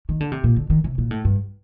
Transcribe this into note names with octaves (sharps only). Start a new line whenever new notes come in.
D#3
D3
C3
A#2
D3
D#3
C3
A#2
A2
G2